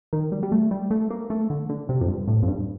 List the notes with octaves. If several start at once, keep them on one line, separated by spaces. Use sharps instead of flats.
D#3
G3
G3
A3
G3
A3
A#3
A3
D3
D3
C3
F2
G2
A2
F2
G2